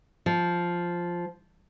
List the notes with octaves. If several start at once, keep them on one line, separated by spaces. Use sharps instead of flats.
F3